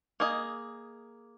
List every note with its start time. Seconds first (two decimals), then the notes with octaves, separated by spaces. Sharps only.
0.20 A#3 G#4 D#5